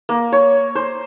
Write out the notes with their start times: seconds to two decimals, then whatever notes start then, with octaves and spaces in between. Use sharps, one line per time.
0.09 A#3
0.32 C#5
0.75 C5